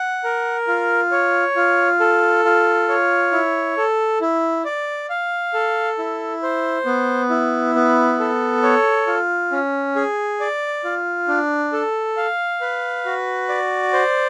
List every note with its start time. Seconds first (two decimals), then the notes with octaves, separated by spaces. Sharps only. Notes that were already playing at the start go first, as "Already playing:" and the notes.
Already playing: F#5
0.24 A#4
0.67 F4
1.11 C#5
1.56 F4
2.00 A4
2.45 F4
2.89 C#5
3.32 E4
3.77 A4
4.21 E4
4.65 D5
5.10 F5
5.54 A4
5.99 E4
6.43 C5
6.86 B3
7.30 E4
7.75 B3
8.19 A4
8.63 C#5
9.07 F4
9.52 C#4
9.96 G#4
10.40 D5
10.84 F4
11.28 D4
11.73 A4
12.17 F5
12.61 B4
13.05 F#4
13.49 D5
13.93 C5